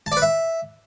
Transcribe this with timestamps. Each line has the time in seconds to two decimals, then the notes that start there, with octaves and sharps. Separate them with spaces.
0.06 A5
0.12 D5
0.17 B4
0.22 E5